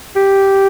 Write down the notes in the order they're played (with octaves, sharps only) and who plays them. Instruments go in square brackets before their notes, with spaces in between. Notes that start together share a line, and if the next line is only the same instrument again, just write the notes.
[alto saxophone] G4